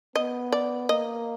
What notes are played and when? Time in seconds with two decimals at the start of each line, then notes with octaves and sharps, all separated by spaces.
0.15 B3 D#5
0.52 D5
0.89 A#3 D#5